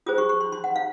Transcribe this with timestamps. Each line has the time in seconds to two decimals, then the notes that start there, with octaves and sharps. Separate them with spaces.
0.06 F4 G#4 C5 D#6
0.18 C#6
0.29 C#6
0.40 C6
0.52 C6
0.64 F#5
0.76 F5